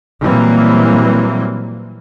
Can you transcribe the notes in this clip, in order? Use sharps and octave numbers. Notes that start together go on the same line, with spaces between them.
A#2 E3 F#3 G3 A#3 C4